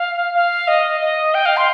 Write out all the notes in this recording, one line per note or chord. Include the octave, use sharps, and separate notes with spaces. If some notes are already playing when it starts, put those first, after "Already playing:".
Already playing: F5
F5
D#5
D#5
G5
F5
C6